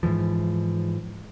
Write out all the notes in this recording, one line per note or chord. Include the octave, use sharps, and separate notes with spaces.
G#2 C#3 E3 F3